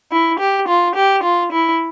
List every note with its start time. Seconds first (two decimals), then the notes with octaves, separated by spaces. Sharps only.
0.11 E4
0.39 G4
0.68 F4
0.95 G4
1.23 F4
1.52 E4